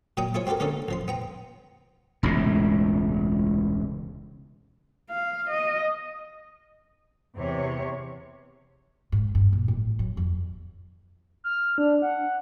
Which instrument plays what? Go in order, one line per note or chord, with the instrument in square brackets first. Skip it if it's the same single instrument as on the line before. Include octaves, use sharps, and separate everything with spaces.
[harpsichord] A#2 F#3 G5 A#5 D#6
E4 F4 G#4 C5 C#5
C4 F#4 G4 A4 A#4
D3 A3 A#3 C#4 D#4 A4
A1 F3 C6
B3 G5 A#5
[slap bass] E1 C#2 A2 C3
[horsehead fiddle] F5
D#5
[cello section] E2 C3 C#5
[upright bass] G#2
G2
A#1
A1
F#3
F2
[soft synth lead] F6
D4
F#5